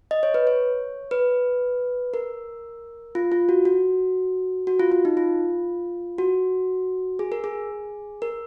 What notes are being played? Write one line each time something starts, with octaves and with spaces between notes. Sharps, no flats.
D#5
C#5
B4
C#5
B4
A#4
F4
F4
F#4
F#4
F#4
F4
F4
D#4
F4
F#4
G#4
A#4
G#4
A#4